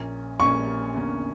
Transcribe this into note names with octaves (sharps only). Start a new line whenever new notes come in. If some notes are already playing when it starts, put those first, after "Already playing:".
Already playing: A#1 A#2 A#3 C#4
A#1 A#2 A#3 C#4 C#6
E2 D3 A#3 C#4